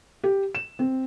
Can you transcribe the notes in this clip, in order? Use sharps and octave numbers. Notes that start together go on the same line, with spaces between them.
G4
E7
C4